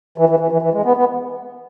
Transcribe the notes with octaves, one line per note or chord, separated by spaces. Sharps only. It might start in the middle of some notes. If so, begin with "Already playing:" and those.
E3
E3
E3
E3
E3
G#3
B3
B3